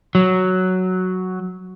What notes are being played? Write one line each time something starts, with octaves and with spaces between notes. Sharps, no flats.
F#3